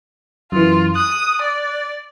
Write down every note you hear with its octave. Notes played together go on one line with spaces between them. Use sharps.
F#2 E3 F4
D#6 F#6
D5